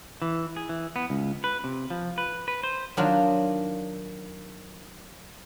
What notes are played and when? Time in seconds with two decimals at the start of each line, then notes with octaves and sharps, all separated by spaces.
0.22 E3
0.56 G#4
0.69 E3
0.96 B3
1.10 C#2
1.44 B4
1.64 C3
1.90 F3
2.18 B4
2.48 B4
2.63 C5
2.97 D#3 F#3 D4 F4